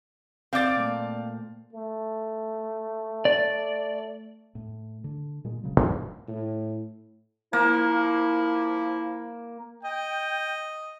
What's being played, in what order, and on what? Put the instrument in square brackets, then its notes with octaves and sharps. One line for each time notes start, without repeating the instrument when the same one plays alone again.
[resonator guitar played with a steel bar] C4 D5 [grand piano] F5 A6
[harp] A#2 A3
[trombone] A3
[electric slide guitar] D5
[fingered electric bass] A2
D3
A#2 G#3
D#1 A1 C#3 F#3
E2 A2 D3 E3
[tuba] A2
[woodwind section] F3 E4 [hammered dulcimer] A#3
[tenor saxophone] D#5 [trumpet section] G5